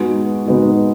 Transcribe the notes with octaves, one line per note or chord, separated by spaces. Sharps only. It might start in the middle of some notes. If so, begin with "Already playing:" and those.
Already playing: D#3 G#3 B3 D#4 F#4
D#3 G#3 B3 D#4 F#4